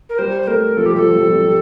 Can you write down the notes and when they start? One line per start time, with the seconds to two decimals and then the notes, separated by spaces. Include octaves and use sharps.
0.09 A#4
0.18 G3 C5
0.42 C5
0.47 A3 A#4
0.77 F3 A4
0.86 G3 G4
0.95 F3 A4
1.03 G3
1.12 F3
1.21 G3
1.30 F3
1.39 G3